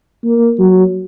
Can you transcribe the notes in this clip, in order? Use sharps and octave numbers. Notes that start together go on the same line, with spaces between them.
A#3
F#3